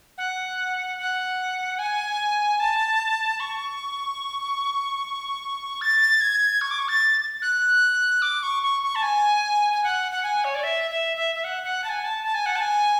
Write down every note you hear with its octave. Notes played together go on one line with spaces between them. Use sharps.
F#5
F#5
G#5
A5
C#6
A6
G#6
C#6
D6
C#6
A6
F#6
D6
C#6
C#6
C#6
A5
G#5
G#5
F#5
F#5
G#5
C#5
D5
E5
E5
E5
E5
F#5
F#5
A5
G#5
A5
A5
G#5
F#5
A5
G#5